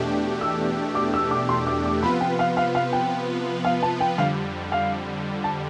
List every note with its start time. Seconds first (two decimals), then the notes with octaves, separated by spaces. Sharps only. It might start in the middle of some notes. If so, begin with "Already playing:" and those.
Already playing: E2 B2 A3 D4 G4
0.41 E6
0.95 D6
1.14 E6
1.31 D6
1.49 C6
1.67 D6
1.85 D6
2.03 C3 F3 B3 F4 B4 B5
2.21 G5
2.39 F5
2.57 F5
2.75 F5
2.93 G5
3.65 F5
3.83 A5
4.01 G5
4.18 F2 D3 G3 F5
4.72 F5
5.44 A5